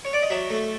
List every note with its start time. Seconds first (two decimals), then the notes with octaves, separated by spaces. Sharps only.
0.05 C#5
0.13 D5
0.22 D#5
0.30 F#3 E5
0.50 A3